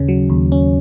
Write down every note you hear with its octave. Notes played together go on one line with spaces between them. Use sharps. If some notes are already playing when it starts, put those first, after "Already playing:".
Already playing: D#2 C#3 C#4
F#3
D#2
C#4